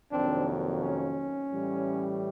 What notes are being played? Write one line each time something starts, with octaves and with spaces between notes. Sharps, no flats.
F2 C3 D#3 F#3 A#3 C4 D4
C#4
A2 E3 G3